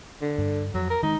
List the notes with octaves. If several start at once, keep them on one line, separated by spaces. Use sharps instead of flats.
D3
G2
F2 F#3
A#4
D#3 G#3 D#4